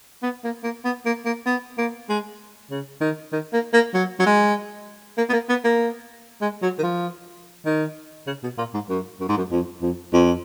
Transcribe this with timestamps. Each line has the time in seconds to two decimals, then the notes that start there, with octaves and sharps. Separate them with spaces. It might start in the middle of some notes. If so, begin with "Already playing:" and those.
0.23 B3
0.44 A#3
0.64 A#3
0.85 B3
1.06 A#3
1.26 A#3
1.46 B3
1.78 A#3
2.09 G#3
2.71 C#3
3.01 D#3
3.32 D#3
3.53 A#3
3.74 A#3
3.94 F#3
4.20 F#3
4.26 G#3
5.18 A#3
5.29 B3
5.33 A#3
5.49 B3
5.64 A#3
6.42 G#3
6.62 F#3
6.79 D#3
6.83 F3
7.66 D#3
8.27 C#3
8.43 B2
8.58 A#2
8.74 G#2
8.89 F#2
9.21 F#2
9.29 G#2
9.38 F#2
9.51 F2
9.82 F2
10.14 F2